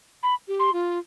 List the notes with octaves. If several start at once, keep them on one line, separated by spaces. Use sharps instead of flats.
B5
G4
C6
F4